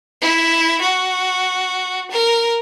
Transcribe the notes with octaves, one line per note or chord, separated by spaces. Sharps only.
E4
F#4
A#4